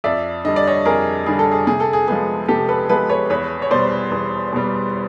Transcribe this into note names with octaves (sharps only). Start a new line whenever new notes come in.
F2 D5 E5
D3 G3 D#5
D5
C#5 D#5
F2 G#4 A#4
D3 G3 G#4
A4
G#4
C3 G#4
A4
G#4
F3 G#3 B3 G#4
C3 G4 A4
A4 B4
F3 G#3 B3 A4 B4
B4 C#5
E2 B4 C#5
C#5
B2 G3 C5 D5
E2
B2 G3